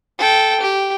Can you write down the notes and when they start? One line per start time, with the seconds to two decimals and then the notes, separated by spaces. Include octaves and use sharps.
0.18 A4 G5
0.61 G4